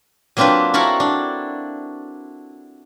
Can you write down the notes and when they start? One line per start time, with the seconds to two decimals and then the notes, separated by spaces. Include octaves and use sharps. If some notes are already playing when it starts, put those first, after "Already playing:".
0.37 F#3 A#3 C4 D4 F4 B4
0.74 E4 F#4 A4 A#4 F5
1.00 D4